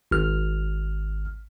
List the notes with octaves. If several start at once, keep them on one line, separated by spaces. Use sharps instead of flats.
G#1 F6